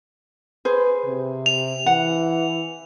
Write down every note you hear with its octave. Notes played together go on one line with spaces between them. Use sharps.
G#4 B4 C5
C3
F7
E3 F#5